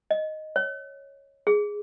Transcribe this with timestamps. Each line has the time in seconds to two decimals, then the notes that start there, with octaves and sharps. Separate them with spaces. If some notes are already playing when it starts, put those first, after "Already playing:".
0.11 D#5
0.56 C#5
1.47 G#4